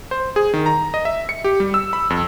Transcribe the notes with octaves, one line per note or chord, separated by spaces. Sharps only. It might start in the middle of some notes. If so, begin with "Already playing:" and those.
C5
G#4
D#3
A#5
D#5
E5
C#7
G4
G3
E6
B5
F2